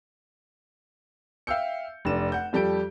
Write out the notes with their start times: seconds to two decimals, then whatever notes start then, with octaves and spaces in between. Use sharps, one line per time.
1.47 E5 F5 G5 E6 G6 C#7
2.05 F1 D4 E7
2.32 F#5 G6
2.53 F2 G3 G4 A4 G6 D7